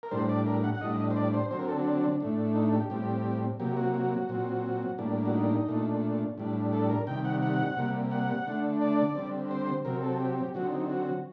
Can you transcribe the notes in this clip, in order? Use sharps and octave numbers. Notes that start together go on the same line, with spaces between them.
A#4
A2 G3 D4 C5
D5
A#4
F#5
F#5
A2 G3 D4 D#5
C5
D5
C5
D3 F#3 C4 C5
A#4
A4
D4
A2 A3 D4
D#4
G4
A2 G3 C4 G4
C3 F#3 A#3 G4
F#4
F#4
A#2 F#3 C4
A2 G3 A#3 D4
F#4
D#4
A#2 A3 D4
A2 G3 D4
A4
A#4
C3 D#3 G3 G5
F#5
F#5
C3 G3 A#3
F#5
D3 A3 D4
D5
D3 G3 C4
C5
C3 F#3 C4 A#4
A4
G4
G4
D3 F#3 C4 F#4
D#4
F#4